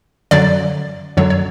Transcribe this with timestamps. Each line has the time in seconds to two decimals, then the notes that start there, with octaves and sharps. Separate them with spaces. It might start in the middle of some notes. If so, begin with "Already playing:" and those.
0.31 F#2 D3 F#3 D5
1.17 F#2 D3 F#3 C#5
1.30 C#5